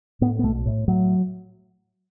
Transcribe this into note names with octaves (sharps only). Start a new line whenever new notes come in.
A2 B3
B3
B1 A3
A2
A2 F#3